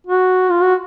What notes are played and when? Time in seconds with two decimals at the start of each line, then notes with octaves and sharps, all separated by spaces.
0.07 F#4
0.51 F4
0.62 F#4